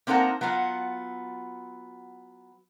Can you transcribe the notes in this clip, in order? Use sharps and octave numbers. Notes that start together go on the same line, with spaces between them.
A#3 C4 D#4 A#4 F#5 A5
F#3 B3 F4 F#5